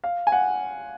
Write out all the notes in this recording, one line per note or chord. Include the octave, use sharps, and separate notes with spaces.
F5
G#5
F#5